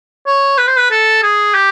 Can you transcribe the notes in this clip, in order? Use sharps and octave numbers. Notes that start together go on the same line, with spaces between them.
C#5
B4
C5
B4
A4
G#4
G4